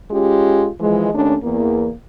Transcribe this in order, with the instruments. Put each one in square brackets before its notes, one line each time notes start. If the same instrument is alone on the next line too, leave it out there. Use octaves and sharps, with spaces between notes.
[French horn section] G#3 C#4 F4 G4
E3 F3 G#3
D#2 A3 C#4 D4
E2 A#3